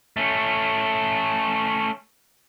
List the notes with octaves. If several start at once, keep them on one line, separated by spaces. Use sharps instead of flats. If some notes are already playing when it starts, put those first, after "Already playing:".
A3 C#4